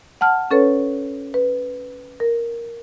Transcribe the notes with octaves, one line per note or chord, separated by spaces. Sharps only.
F#5 A5 F6
C#4 A4 B4 C#5
B4
A#4